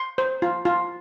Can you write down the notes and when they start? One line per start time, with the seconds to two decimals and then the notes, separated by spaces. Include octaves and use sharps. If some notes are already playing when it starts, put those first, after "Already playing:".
Already playing: C6
0.18 C5
0.42 F4
0.65 F4